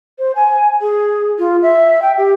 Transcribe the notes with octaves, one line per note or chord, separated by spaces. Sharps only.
C5
G#5
G#4
F4
E5
G5
G4